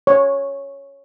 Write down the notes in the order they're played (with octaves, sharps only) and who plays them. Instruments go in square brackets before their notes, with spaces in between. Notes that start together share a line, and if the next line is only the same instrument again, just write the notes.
[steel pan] C#5